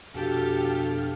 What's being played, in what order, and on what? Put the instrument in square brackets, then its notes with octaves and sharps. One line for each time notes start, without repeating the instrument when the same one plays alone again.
[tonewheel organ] F2 B2 F5 [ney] D4 [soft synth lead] F#4 [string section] G4 A4